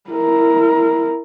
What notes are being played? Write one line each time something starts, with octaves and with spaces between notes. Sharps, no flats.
E4 A#4